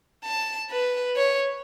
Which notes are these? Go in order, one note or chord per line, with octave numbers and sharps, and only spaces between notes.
A5
B4
C#5